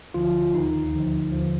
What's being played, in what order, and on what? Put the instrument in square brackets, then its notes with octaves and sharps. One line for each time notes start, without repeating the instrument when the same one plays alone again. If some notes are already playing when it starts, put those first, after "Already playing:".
[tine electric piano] D2 D3 F3 F4
D#2 D#3 D#4
D2 D3 F3
D#2 D3 F3